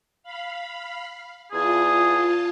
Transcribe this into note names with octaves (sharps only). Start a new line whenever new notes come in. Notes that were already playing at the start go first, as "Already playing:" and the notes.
F5 B5
E2 F4 G#4 A5